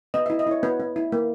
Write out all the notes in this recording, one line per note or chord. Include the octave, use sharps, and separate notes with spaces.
B3 D#5
E5
E4
D#5
E4 C#5
B3 B4
B3
E4
A#3